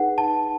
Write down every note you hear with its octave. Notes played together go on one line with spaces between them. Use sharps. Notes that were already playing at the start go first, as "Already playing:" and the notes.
Already playing: D#4 G#4 B4 F#5
A5